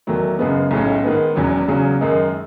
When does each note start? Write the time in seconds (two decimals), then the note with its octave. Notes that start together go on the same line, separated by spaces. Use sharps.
0.07 E2 D#3 F#3 A3
0.39 F#2 C#3 G#3 B3
0.71 B1 A2 G#3 C#4
1.04 G#2 D#3 G#3 B3
1.36 E1 E2 B2 F#3 C#4
1.67 E2 C#3 F#3 C#4 G#4
2.01 F#2 D#3 G#3 D#4